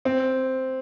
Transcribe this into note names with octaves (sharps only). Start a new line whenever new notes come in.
C4